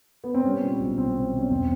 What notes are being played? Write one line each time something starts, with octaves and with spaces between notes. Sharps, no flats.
B3
C4
G3 C#4
A#2
B1
B1 C4
B1
B1
C#4
E1 C4